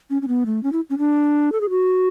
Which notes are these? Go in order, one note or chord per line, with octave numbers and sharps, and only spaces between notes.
C#4
C#4
B3
A3
C#4
E4
C#4
D4
A4
G#4
F#4